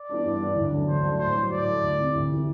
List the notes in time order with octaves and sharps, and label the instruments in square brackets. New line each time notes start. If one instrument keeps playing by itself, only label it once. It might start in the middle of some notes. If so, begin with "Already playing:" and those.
Already playing: [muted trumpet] D5
[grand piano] E3 B3 D4
G2
E3 B3 D4
D2
D3 F#3 A3 D4
[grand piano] D2 [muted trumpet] C5
[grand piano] D3 F#3 A3 D4
[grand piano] A2 [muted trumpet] C5
[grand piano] F#3 A3
[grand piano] A2 [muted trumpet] D5
[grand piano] F#3 A3
D2
C3 E3
D2
C3 E3